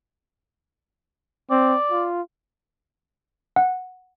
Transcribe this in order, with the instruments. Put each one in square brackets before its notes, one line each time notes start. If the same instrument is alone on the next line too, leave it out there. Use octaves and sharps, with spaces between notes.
[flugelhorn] C4 [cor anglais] D5
[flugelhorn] F4
[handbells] F#5